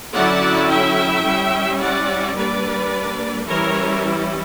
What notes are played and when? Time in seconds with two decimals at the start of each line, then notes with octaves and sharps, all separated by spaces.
0.14 D3 F#3 C#4 E4 D5 F#5
0.70 E5 G5
1.25 G3 C#4 E4
1.80 D5 F#5
2.35 G3 A#3 D4 B4 D5
3.47 E3 G3 C#4 E4 A#4 C#5